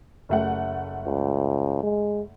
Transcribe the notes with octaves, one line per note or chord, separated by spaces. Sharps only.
F#1 A3 F#5
C#2
G#3